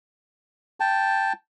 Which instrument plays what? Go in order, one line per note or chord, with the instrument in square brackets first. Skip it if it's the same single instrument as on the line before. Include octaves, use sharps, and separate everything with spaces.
[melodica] G5 A5